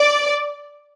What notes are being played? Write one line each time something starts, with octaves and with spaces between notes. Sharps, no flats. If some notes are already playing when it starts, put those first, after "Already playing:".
Already playing: D5